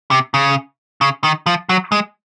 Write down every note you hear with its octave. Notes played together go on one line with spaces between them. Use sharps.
C3
C#3
C#3
D#3
F3
F#3
G#3